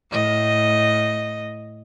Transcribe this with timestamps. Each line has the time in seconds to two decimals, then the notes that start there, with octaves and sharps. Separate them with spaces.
0.11 A2 D#5